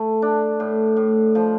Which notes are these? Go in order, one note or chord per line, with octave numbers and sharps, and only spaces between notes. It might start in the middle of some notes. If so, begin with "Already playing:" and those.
Already playing: A3
D4
A2
A2
F3